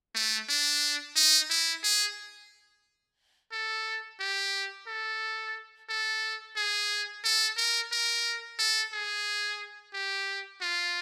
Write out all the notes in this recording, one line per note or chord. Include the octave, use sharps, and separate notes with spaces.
A3
D4
D#4
E4
G#4
A4
G4
A4
A4
G#4
A4
A#4
A#4
A4
G#4
G4
F4